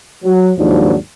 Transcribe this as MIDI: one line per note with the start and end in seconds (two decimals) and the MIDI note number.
0.24 0.51 54
0.57 0.95 39
0.57 0.95 44
0.57 0.95 53
0.57 0.95 54
0.57 0.95 62